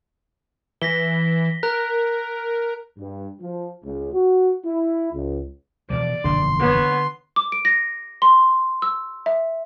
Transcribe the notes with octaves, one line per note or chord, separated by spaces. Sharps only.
E3 A#6 B6 G7
A#4 A#5 F#6
G2
F3
C#2
F#4
E4
C#2
B2 E3 F3 D5
E1 A#1 F#2 D3 C6
B3 C#5
D6
D7
A#6
C6
E6
E5